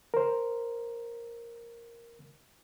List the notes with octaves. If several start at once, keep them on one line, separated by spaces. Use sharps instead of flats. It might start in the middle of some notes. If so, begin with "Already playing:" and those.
A#4 C5